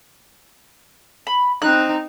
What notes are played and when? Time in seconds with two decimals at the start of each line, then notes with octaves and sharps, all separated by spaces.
1.27 B5
1.62 C4 D#4 F#6